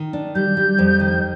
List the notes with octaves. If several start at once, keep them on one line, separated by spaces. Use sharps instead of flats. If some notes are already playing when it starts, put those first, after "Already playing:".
Already playing: D#3
D4
G3 G6
G3
F2
D#3